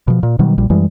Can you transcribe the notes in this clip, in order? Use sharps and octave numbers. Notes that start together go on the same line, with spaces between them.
B2 F3
A#2
B2 D#3 F#3 G3
A#1 A#2 G3
F#2 E3 G3 G#3